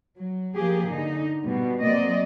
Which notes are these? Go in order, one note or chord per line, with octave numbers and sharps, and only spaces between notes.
F#3
F3 A#3 G4 G#4
D3 D#4
B2 G3
F#3 A#3 C4 D5 D#5